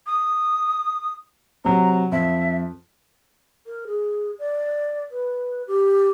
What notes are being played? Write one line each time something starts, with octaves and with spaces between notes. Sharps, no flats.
D#6
C3 F#3 A#5
F2 E5
A#4
G#4
D5
B4
G4